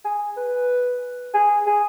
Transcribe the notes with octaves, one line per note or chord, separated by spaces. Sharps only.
G#4
B4
G#4
G#4